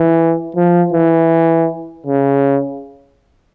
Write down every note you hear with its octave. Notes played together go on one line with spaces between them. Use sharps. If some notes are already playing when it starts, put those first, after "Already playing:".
Already playing: E3
F3
E3
C#3